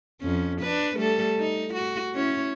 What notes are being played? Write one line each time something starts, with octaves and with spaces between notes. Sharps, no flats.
F2 C#4
D4 B4
G3 A3 A4
D#4
F#4
C#4 E4 C#5